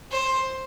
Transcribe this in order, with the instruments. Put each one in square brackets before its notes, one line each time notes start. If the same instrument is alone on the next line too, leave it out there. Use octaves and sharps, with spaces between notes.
[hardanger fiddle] C5